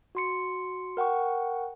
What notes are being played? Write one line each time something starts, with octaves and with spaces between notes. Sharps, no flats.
F#4 C6 C#7
A#4 F#5 G5 C#6